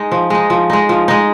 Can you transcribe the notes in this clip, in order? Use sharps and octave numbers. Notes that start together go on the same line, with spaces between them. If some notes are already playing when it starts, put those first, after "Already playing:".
Already playing: G#3 D#4
F3
G#3 D#4
F3
G#3 D#4
F3
G#3 D#4